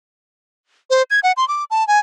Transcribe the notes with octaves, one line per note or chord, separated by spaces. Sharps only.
C5
G#6
F#5
C6
D6
A5
G#5